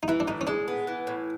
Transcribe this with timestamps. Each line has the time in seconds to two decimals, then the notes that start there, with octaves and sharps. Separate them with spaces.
0.03 D#4
0.08 E3 E4
0.20 D4
0.28 A2 D#4
0.41 C#4
0.47 G#3 D4
0.68 B3
0.87 E3
1.07 A2